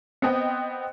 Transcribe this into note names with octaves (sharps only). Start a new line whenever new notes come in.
B3 C4 D#5 G5